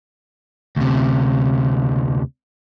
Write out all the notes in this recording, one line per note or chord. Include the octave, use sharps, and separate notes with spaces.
D2 C3